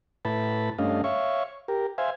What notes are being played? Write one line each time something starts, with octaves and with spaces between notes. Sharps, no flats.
A2 E4 B4 A5 B5
G2 A3 C#4 D4 D#5 F5
C#5 E5 F5 C#6
G4 A#4
C5 E5 F5 G#5